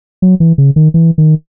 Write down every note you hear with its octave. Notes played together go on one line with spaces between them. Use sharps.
F#3
E3
C#3
D#3
E3
D#3